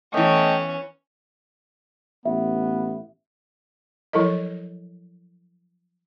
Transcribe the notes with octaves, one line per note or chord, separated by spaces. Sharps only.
E3 A3 B3 C#4 D#5 G5
A1 B3 E5
F3 F#3 E4 A4 A#4 D#5